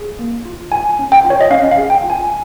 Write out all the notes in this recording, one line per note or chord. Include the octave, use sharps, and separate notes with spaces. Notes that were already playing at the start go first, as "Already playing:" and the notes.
Already playing: G#4
A#3
F4
F4 G#5
C#4
G5
F4
C#5
D#5
C#4 F5
F5
G#4
G5
F4
G#5